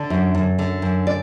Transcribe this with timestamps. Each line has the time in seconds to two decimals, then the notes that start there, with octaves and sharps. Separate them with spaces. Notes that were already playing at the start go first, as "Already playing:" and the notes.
Already playing: D3 D5
0.10 F#2
0.35 F#2
0.59 D3
0.82 F#2
1.07 D5